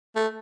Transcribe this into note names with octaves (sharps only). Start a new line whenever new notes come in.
A3